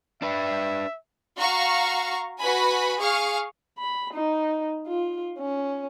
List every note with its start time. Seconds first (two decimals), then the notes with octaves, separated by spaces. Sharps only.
0.22 D4 B4 E5
1.37 F#4 F5 A#5 C#6
2.39 F#4 B4 G#5 B5
2.99 G#4 F5 C#6 F6
3.78 B5
4.14 D#4
4.87 F4
5.39 C#4